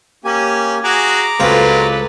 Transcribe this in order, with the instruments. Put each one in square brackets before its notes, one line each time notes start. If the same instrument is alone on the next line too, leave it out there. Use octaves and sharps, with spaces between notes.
[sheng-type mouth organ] A#3 G4 G#5 [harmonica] C#4
[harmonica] F#4 G#4 [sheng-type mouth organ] A#5 D6
[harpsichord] C#2 C4 F4 [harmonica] F#3 G#3 [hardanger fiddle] A4 B4